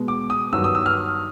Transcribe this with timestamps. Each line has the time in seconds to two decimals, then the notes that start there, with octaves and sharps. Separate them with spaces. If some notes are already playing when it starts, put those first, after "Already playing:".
Already playing: B2 G#3 B3
0.08 D6
0.30 D#6
0.53 G2 D#3 F#3 B3 E6
0.64 D#6
0.75 E6
0.86 F6